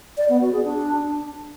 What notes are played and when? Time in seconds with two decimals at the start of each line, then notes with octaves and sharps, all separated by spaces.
0.17 D5
0.29 B3
0.41 F#4
0.53 G#4
0.64 D4